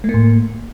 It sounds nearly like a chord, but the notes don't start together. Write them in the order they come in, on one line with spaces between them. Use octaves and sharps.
A3 A#3 A2